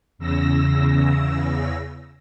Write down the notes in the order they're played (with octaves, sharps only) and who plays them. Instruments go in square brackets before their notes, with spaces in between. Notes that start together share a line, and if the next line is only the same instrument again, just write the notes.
[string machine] E2 C#3 E6 A#6